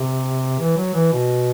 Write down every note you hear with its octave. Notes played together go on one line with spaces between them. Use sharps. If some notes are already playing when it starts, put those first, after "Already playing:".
Already playing: C3
E3
F#3
E3
B2